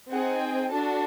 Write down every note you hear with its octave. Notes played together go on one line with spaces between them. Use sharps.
C4 D#4 G#4 F#5
G5
D4 F#4 A4 A5